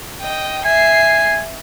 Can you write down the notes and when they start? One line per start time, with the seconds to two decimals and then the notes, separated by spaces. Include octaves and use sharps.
0.22 D#5 G5
0.66 E5 G#5 C7